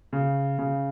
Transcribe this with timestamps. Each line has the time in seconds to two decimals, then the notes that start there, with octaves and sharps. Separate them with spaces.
0.13 C#3
0.59 C#3